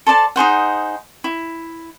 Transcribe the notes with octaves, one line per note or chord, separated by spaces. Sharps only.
A4 C5 D5 A5
D#4 G#4 C5 F#5
E4